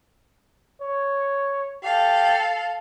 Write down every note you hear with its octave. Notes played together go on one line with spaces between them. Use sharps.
C#5
G4 A4 F5